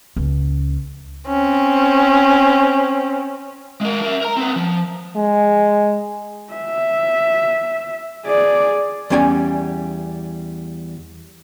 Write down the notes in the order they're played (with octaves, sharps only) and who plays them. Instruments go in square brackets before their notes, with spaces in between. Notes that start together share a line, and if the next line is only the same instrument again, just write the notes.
[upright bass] C#2 C#4
[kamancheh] C4 C#4
[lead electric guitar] G#3 A#4
A#4 E5
A#4 A#5
C4 B4
F3
[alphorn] G#3
[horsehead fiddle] E5
G#4 D5
[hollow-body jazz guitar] E2 G3 C#4 D5 G5 G#5